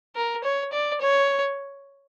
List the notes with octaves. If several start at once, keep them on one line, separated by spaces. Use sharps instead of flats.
A#4
C#5
D5
C#5